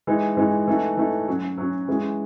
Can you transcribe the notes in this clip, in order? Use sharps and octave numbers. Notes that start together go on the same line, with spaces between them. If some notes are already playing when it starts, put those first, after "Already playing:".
E3 G#3 D#4 F#4
E3 G#3 D#4 F#4
E3 A3 D#4 F#4
E3 A3 D#4 F#4
F#3 C#4 F#4
F#3 C#4 F#4
E3 G#3 C#4 F#4